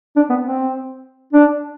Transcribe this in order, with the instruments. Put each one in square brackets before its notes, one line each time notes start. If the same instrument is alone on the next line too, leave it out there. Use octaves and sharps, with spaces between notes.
[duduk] D4
B3
C4
D4